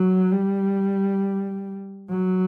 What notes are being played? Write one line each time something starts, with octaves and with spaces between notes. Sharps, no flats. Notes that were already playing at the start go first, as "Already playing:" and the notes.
Already playing: F#3
G3
F#3